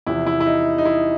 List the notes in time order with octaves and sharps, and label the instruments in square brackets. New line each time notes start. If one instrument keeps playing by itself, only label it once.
[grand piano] E2 C3 F3 E4
E4
E4
D#4
D#4
E4